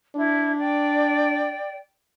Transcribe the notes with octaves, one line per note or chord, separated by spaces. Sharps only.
D4 E4
D5 G5